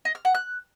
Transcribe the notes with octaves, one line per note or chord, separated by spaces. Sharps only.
D#5
F6
F#5
F#6